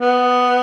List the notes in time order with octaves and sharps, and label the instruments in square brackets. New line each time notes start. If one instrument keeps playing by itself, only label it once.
[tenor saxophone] B3